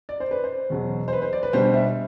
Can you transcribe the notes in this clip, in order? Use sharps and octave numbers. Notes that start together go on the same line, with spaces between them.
D5
C5
B4
C5
E2 B2 F#3
C5
B4
C5
D5
B4
B2 G3 D4 C5
C5
E5